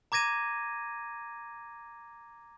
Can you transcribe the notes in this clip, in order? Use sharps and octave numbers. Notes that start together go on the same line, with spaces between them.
A#5 D6 G#6 A#6 D#7